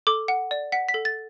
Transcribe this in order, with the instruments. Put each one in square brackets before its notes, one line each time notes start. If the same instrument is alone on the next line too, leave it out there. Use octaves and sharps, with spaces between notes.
[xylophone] A4 D6
F#5
D5
F#5 B6
B6
A4
A6